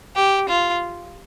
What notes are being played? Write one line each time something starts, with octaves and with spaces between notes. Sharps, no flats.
G4
F4